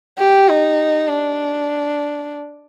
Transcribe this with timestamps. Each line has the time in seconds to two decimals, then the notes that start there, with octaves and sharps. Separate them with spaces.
0.18 G4
0.48 D#4
1.09 D4